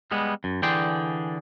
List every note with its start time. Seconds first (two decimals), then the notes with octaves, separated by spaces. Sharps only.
0.11 G3 G#3 B3
0.44 F#2
0.62 D3 E3 G#4 D5 G5 C6